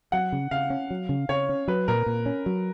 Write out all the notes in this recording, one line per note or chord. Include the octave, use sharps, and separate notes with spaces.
F#3 F#5
C#3
C#3 F5
C#4
F#3
C#3
C#3 C#5
C#4
F#3 B4
A#2 A#4
A#2
C#4
F#3